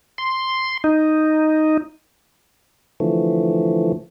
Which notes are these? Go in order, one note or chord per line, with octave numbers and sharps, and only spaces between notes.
C6
D#4
D3 E3 F3 A3